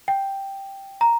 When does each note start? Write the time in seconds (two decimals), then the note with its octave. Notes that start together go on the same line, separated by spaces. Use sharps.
0.08 G5
1.01 A#5